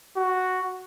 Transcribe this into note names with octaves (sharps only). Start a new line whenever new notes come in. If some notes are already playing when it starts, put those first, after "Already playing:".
F#4